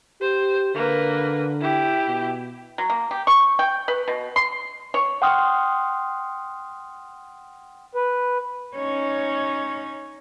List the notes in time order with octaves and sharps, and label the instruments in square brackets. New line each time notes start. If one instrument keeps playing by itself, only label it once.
[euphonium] G4 [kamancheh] C5
[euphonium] D3 [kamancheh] A#3 B4
[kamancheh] E4 G4
[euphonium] B2
[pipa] F#3
A#3
G4
C#6
G5
B4
B2
C6
C#5
[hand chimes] F#5 G5 C6 D#6 F6
[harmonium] B4
[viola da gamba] C#4 D#4 C#5